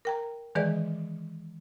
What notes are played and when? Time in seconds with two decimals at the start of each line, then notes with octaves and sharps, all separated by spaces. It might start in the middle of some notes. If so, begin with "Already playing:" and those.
0.05 A#4 G5 A#5
0.55 D#3 E3 G#3 G#4 B4 D5